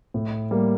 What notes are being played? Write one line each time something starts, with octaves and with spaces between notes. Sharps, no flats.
A2
G3 A#3